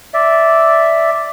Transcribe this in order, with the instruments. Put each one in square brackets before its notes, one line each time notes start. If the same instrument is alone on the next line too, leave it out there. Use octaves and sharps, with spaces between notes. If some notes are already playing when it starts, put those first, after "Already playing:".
[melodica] D5 E5